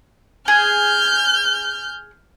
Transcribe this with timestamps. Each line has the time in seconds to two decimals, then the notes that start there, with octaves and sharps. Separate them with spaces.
0.48 G#4 F6 G6